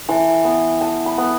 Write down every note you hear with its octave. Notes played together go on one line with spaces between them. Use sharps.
E3 A5
B3
E3 A5
B5
B3